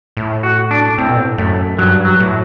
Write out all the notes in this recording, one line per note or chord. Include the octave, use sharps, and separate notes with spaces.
A2
F#4
D4
A2 C4
B2
A2
F#2 A3
G2 F#3
F#3
A2